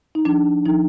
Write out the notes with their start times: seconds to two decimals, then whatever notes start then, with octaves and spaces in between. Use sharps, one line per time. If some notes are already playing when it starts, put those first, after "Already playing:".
0.15 D#4
0.25 F3 D4
0.66 F3 D#4